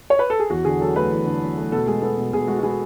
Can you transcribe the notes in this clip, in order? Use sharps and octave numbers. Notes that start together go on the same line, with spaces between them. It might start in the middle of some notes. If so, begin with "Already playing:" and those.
C#5
B4
A4
G#4
E2 F#4
D3 G#4
F#3 A4
A3 B4
E2
D3
F#3
A3
B2 A4
G#3 G#4
B3 A4
B2
B2 G#4
G#3 F#4
F#4
B3 G#4